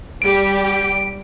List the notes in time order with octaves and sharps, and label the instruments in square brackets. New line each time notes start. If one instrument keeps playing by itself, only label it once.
[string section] G3 G4 [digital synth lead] D7